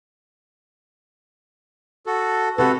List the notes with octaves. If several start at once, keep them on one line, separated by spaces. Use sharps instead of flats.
F#4 A4
C3 F#4 G4 A4 B4